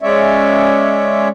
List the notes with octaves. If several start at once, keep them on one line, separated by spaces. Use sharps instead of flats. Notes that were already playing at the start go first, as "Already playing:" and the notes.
G#3 C#4 C#5 D5 E5